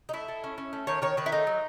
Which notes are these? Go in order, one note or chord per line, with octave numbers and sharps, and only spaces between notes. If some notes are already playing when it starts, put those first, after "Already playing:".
D#4
A3 E4
A3
C#4
C#4
A3
D#3 C#5
D#3 C#5
D#3 B4
E4
A3 D#4
F#3